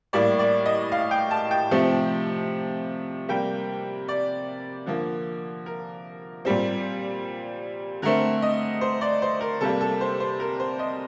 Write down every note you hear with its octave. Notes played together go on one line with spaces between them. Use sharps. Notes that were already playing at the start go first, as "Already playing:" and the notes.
A2 G3 A#3 D5
D5
D#5
F5
G5
A5
G5
C3 F3 A3 C4
C3 G3 A#3 G5
D5
D3 F3 A#3
A#4
A#2 G3 C4
D3 A3 C4 A#4
D#5
C5
D5
C5
A#4
C3 G3 A#3 A4
A4
C5
C5
A#4
C5
D#5